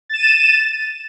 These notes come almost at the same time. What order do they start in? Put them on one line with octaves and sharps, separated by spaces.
A6 E7 D#7